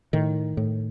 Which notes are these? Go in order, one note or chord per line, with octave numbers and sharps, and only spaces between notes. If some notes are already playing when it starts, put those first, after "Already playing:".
A2 D#3
A2